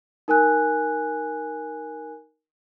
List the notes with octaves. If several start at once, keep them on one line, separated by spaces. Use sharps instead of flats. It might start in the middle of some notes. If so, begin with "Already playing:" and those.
D#4 A#4 G#5 F#6